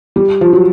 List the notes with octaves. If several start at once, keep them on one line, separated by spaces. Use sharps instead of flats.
G3
F3
F#3